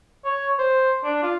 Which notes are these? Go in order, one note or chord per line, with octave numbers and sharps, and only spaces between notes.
C#5
C5
D4
F4